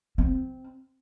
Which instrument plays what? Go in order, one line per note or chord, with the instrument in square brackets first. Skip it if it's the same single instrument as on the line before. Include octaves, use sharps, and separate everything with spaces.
[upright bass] C4